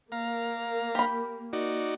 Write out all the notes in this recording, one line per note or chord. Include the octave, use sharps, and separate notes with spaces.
A#3 F5 A#5
G4 B5
D#4 F#4 D5